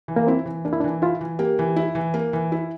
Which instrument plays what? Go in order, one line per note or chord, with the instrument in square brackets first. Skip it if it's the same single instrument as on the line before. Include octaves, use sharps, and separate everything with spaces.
[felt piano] E3
[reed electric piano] A#3
[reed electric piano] C4 [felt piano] E4
[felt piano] E3
[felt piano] A#3 [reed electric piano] D4
[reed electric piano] E4
D4
[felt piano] E3
[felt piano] E4 [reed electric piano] F4
[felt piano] E3
[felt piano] A#3 [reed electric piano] G4
[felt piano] E3
E4
E3
A#3
E3
E4